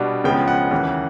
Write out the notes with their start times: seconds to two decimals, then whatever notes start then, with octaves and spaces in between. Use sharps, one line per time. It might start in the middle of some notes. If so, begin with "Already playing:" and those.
Already playing: B2 G3 B3 D4
0.24 C#2 C#3 F3 G#3 B3 G5
0.48 F#5
0.71 D#2 C#3 E3